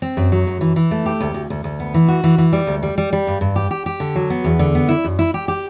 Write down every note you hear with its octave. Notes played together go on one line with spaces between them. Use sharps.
C4
F#2
F#3
F#2
E3
E3
A3
G4
D2
D2
D2
D2
B3
E3
F#4
E3
E3
G3
D2
G3
G3
G3
G2
G2
G4
G4
G4
D3
F#3
B3
E2
D3
B3
E4
F#2
E4
G4
G4